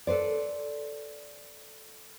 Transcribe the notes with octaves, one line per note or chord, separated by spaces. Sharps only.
A4 B4 C5 D5